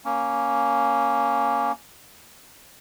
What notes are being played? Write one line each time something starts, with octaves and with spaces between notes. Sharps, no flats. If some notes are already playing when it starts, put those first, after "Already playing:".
A#3 C#4